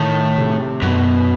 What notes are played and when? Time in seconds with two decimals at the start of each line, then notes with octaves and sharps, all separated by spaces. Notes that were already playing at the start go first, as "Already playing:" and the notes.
Already playing: A2 D#3
0.38 C3
0.82 F#2 B2